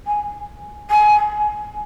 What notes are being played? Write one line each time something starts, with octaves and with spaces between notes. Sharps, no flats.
G#5
G#5